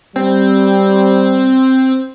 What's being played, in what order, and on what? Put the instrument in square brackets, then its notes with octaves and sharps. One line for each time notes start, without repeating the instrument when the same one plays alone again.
[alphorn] G3 [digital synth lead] C4